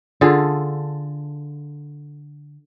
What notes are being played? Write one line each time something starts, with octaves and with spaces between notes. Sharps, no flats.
D3 F4 G#4 A4